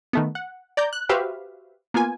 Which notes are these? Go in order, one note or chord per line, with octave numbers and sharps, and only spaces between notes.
D#3 A3 B3
F#5
D5 A#5 G6
F#6
F#4 G4 B4 C5 E5 F5
A#3 B3 F4 G#5